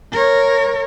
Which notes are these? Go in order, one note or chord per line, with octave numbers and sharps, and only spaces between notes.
A#4 C#5